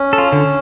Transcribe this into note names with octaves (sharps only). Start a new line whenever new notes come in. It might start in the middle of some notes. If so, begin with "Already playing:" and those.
Already playing: C#4
A4
F4
D3